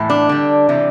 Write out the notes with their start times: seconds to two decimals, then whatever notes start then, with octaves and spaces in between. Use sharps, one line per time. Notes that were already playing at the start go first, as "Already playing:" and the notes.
Already playing: A2 E3 A3
0.10 D4
0.29 D3 G3
0.69 C3 E3 G3